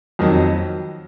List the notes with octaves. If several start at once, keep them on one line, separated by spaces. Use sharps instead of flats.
F2 D#3 F#3